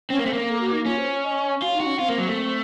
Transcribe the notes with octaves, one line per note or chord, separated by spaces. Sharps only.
C4 C#4
A#3
A3 C4
A#3
A4
F#4
D#4
C#4 F4
C5
C#5
D#5
C#5
F4 F#4
D#4
F#4
C#4
C4 F4
A#3
F#3
A3